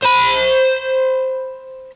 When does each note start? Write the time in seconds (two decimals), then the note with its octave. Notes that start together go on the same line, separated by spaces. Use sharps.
0.02 C5 B5